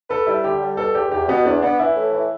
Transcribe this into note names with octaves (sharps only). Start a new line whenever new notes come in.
A4 B4
G3 E4
D3 G4
G3
B2 A4
E2 G4
E2 G4
B2 B3
E2 D4
B3 D4
E3 E4
A2
E3